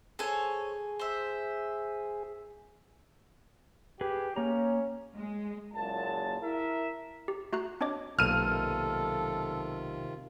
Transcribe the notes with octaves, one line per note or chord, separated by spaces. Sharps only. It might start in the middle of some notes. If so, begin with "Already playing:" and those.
G#4 A4 C5 C#5 G#5
C5 E5
G4 G#4 B4
A#3 C#4 A#5
G#3
F#1 F#2 A#2 A5
E4 A#4 E5
G4
A3 F#4 A#5 F#6
C4 D4 C#5 D#5 D6
B1 C3 D#3 A#3 F4 A4 F6 D#7